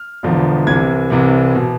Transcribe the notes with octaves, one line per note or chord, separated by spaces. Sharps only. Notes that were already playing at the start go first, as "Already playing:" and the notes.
Already playing: F6
E1 E2 D3 F3
C2 C3 E3 G#6
C2 C3 E3
B2